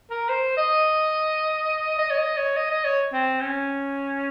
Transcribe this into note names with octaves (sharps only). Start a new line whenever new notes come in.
A#4
C5
D#5
D#5
C#5
D#5
C#5
D#5
D#5
C#5
C4
C#4